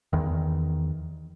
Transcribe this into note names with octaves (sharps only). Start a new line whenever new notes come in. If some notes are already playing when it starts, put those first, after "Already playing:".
E2 D#3